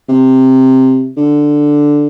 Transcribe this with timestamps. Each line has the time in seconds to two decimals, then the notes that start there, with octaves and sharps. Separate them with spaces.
0.09 C3
1.17 D3